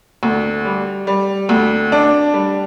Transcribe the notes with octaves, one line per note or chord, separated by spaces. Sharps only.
D2
G3
G3
D2
D4
G3